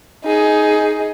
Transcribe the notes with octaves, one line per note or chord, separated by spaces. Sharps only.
D#4 G#4